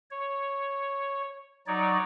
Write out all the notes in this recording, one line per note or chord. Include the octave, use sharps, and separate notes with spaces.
C#5
F#3 D#4 C#5 D5